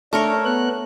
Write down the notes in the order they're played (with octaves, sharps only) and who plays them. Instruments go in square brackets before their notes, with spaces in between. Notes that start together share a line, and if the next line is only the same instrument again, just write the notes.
[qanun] A3 A#4 C#5 [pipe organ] D4
[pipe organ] B3 F#6